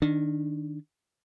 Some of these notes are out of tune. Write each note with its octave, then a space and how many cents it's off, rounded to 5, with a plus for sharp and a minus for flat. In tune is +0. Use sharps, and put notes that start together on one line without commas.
D#3 -5 D4 +0